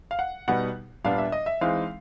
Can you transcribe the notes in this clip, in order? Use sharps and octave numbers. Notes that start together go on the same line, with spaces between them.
F5
F#5
B2 G3 B3 D#4 F#5
A#2 G3 B3 D4 F5
E5
D#5
E5
E3 G#3 C4 D#4 F5